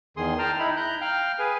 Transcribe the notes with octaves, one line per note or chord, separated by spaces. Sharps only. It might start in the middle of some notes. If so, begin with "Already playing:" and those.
E2 D#3 G#4 C6 D#6
G5 A5 A#5 F6
D#4 E4 B5
A#5 F#6 G6
F5 G5 F6
G#4 B4 G#5